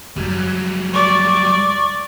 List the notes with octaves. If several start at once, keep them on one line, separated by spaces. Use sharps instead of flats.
F#2 C#3 F#3 G3
D5 C#6